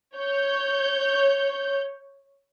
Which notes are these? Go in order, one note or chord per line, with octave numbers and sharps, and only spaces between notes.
C#5 G6